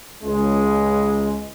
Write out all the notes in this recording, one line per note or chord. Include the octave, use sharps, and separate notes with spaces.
C#2 G#3